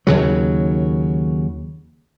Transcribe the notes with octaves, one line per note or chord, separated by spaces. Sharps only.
D#2 C#3 F#3